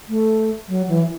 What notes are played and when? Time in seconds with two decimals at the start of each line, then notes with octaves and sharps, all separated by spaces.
0.09 A3
0.68 F#3
0.88 E3